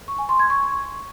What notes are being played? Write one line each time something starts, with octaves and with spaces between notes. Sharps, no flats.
C#6
G#5
C6
G#6
C#6